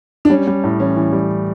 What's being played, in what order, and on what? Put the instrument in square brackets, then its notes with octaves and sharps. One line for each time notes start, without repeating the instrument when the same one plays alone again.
[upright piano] D4
[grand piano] G3 [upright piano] C#4
[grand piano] G3
A2
[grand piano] E3 [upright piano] C#4
[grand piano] E3
G3